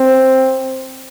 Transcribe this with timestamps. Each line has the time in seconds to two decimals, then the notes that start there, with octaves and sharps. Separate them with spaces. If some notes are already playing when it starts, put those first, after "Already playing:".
Already playing: C4